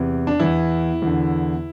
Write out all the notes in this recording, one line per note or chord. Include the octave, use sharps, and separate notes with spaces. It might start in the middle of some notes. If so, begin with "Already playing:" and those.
Already playing: E2 C3 E3
D4
E2 E3 E4
E2 D3